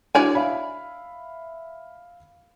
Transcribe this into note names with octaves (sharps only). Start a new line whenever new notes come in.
D4 E4 F#4 C#5 D5 G#5
E5 F5 B5